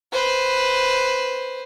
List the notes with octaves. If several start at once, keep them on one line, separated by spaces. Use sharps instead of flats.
B4 C5